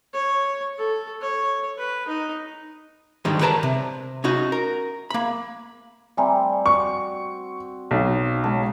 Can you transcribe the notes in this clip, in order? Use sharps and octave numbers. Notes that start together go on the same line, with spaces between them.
C#5
A4
C#5
B4
D#4
G#2 D3 D#3 G3 G#3
A#4 B4 C#5 D5 A5 A#5
C3
C#4 D#4 F#4
A#4
A#3 B5
G3 C4 E5 G#5 A#5
F#4 C#6
B1
C#3 G#3 A5